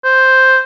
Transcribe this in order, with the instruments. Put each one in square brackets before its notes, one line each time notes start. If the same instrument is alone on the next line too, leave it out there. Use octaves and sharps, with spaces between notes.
[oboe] C5